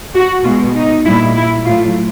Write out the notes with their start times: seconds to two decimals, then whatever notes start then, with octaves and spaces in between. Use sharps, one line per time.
0.15 F#4
0.44 B2 F4
0.49 G#3
0.74 D#4
1.04 A#2 G3 E4
1.36 E4
1.65 A2 F#3 A3 F4